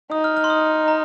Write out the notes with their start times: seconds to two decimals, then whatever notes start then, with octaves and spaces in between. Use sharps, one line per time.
0.11 D#4 D#6
0.24 F6
0.37 F6
0.44 C6
0.50 D#6
0.88 A#5